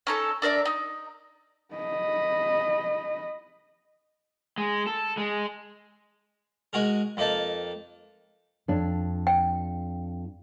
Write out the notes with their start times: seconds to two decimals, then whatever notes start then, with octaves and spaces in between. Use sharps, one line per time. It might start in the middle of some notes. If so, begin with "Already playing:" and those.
0.07 C#4 D#4 A4
0.42 D4 A#4 D5 E5
0.65 D#4
1.75 D#5 B5
4.58 G#3
4.87 A4
5.18 G#3
6.73 G#3 F#4 G#4 A#4
7.17 F2 A#3 D#4 A5
8.68 F2 D4
9.27 G5